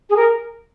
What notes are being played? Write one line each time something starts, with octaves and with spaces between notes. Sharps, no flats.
G#4
A#4